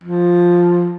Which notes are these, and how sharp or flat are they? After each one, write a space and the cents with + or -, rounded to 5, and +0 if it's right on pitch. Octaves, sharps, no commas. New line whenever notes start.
F3 +5